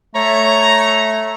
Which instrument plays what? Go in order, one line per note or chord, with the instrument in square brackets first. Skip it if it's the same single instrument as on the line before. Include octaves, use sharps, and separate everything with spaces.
[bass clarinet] A3 [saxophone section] C#5 [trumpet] A#5